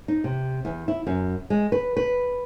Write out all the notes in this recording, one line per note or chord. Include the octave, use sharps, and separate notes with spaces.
D#4
C3
E2
E4
F#2
G#3
B4
B4